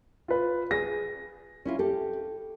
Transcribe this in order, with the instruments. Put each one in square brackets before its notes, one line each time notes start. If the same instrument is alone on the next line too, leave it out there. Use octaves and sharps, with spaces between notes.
[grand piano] F4 B4
[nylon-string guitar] G#4 [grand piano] A#6
[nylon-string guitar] C#4 E4 F4
G4 A4